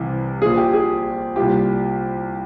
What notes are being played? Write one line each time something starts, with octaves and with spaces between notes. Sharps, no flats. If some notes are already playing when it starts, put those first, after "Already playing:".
Already playing: C2 C3 E3
A#1 A#2 G#4
G4
G#4
C2 A#2 G4